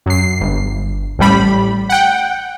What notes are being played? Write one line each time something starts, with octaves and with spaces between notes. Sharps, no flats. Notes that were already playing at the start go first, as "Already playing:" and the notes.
F#2 C7
G1
A1 A2 G3 B5
F#5 G5